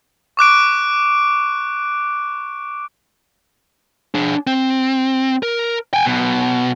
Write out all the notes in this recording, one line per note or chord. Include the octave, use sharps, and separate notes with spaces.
C#6 D6 F#6 D7
D4 G#4
C4
A#4
G5 G#5
B1 B2